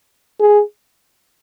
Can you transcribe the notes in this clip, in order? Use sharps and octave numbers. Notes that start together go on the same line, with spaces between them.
G#4